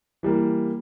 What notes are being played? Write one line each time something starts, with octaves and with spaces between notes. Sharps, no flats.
E3 G3 A#3